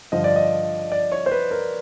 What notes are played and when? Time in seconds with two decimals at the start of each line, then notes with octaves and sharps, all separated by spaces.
0.12 G2 D3 F3 D#5
0.24 D5
0.36 D#5
0.92 D5
1.12 C#5
1.26 C5
1.31 B4
1.51 A#4